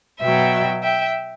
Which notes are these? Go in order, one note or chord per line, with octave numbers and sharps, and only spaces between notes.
B2 F#3 E5 G5
E5 G5